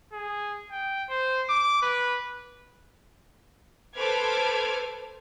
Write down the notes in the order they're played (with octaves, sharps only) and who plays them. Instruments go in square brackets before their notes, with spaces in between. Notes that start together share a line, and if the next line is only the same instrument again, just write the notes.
[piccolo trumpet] G#4
G5
C5
D6
B4
[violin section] A4 B4 C5 D6 F6 G#6